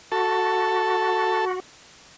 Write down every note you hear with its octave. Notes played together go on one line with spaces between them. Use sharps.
F#4 A4